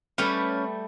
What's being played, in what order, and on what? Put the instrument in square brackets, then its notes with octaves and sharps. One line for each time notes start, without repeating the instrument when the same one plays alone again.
[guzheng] G3 A3 B4 [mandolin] C#4